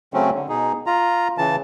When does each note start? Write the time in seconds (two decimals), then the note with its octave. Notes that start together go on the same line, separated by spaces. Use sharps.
0.14 C#3 F#3 A3 C4 C#4
0.34 D3
0.49 B2 D#4 G#4
0.87 F4 A#5
1.38 C#3 E3 A5